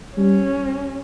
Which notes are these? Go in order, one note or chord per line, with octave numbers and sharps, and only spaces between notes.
G3 C#4